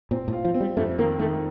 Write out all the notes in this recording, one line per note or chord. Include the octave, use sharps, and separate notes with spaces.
A#2 C4
A2
F4
F3
C4
G3
F2 A3
D#3 A#3
D#3 A3